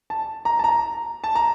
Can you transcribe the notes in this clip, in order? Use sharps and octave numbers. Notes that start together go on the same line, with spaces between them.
A5
A#5
A5
A#5
A5
A#5